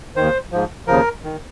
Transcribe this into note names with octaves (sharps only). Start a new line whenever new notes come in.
D#2 D#3 C5
G#2 F3
D#2 C#3 F3 A#4
D#3